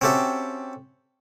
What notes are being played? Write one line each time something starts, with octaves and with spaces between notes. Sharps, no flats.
C4 C#4 F#4 G4 A4 E5